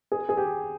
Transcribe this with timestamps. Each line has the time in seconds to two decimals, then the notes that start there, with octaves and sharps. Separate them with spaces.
0.12 G#4
0.29 G#4
0.37 G4